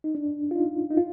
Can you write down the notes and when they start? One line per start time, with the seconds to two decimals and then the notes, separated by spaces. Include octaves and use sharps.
0.04 D#4
0.15 D4
0.51 F4
0.56 D#4
0.91 D#4
0.97 F4